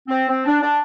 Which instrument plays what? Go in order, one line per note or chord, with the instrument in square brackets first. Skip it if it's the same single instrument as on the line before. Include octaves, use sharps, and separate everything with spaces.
[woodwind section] C4
C4
D4
D4